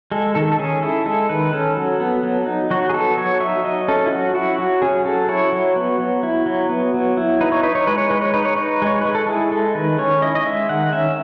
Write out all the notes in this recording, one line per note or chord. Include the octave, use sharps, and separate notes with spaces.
G#3 A4
D#3 A4
A4
C#4 G#4
E4 A4
G#3 A4
D#3 B4
C#4 A4
F#3
B3
F#3
D#4
F#3 F#4
G#4
B3 A4
F#3 C#5
D#4 E5
F#3 D#5
C#4 A4
E4
F#3 F#4
E4 F#4
F#3 F#4
C#4 G#4
F#3 A4
E4 C#5
F#3
B3
F#3
E4
F#3
B3
F#3
E4
D#4 B4
C#5
D#4 B4
C#5
G#3 B4
C#5
G#3 B4
C#5
D#4 B4
C#5
D#4 B4
G#3 C#5
G#3 B4
A4
E4 G#4
G#3 A4
D#3 B4
C#4 C#5
E4 D#5
D#5
G#3 E5
D#3 F#5
C#4 E5